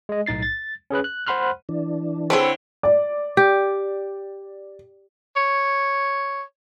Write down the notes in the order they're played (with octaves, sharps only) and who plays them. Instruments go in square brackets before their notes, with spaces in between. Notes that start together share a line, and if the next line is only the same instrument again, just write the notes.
[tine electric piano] G#3 D#5
B1 A2 D#4 A6 C7
A6
C#4 G#4 B4 F#6
F#6
C5 F#5 B5 C6 F6 F#6
[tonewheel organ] E3 D4
[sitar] D3 E4 C#5 [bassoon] C4 [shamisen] G#4 A4 B4
[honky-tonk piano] D5
[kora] G4
[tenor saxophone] C#5